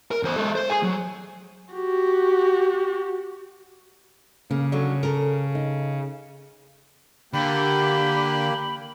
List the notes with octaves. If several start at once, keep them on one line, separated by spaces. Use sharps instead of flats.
A#4
E2 C5
G#3 A4
C5
G#4 G#5
F#3
F#4 G4
C#3 A#3
D3 F#3
A4 A#4
D#4
D3 A#3 G4 B5